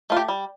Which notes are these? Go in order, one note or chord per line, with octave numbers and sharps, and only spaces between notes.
A3 F4
G4
G3